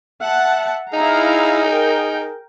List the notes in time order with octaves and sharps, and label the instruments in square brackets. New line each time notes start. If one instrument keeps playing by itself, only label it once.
[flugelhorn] E5 [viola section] F#5 A5
[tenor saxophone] D#4 [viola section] E4 F5 A#5 [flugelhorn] G#4
[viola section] A#4 G5